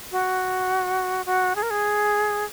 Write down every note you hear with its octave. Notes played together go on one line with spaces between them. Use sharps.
F#4
F#4
G#4
A#4
G#4